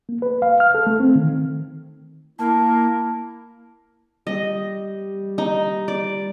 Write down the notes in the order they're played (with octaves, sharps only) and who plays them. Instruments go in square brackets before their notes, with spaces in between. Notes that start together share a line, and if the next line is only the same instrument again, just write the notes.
[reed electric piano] A#3
B4
F5
F6
A4
A3
C4
D#3
[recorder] A#3 [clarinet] E4 [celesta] A5 F6
[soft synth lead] G3 [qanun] D#5
[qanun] D#4
D5